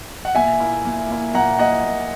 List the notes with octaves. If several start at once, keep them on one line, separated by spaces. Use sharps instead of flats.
F#5
A#2 E5 G#5
A#3 E4
A#2
A#3 E4
A#2 F#5 A#5
A#3 E4 D#5 F#5
A#2